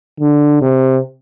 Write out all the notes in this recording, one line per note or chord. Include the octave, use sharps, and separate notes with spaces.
D3
C3